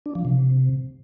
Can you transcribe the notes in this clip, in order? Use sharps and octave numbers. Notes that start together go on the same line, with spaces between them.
D4
F3
C3